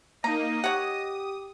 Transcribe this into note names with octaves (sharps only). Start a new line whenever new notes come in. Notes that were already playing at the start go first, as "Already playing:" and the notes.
A#3 D#4 D#5 A#5
G4 C#5 F#5 D#6